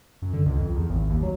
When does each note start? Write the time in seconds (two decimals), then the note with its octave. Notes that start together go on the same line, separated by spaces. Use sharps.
0.22 F#2
0.34 D3
0.46 C#2
0.59 F2
0.76 E2
0.90 G#1
1.10 D#2
1.23 F#3